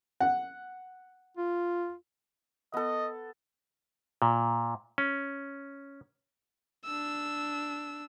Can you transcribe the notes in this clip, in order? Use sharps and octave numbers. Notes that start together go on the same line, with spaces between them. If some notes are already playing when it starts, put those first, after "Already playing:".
F#5
F4
B3 A4 D#5
A#2
C#4
D4 E6